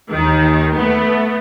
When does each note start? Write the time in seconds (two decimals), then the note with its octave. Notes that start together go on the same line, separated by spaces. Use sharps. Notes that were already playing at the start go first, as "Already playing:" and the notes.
0.11 D#2 D#3
0.75 A3 B3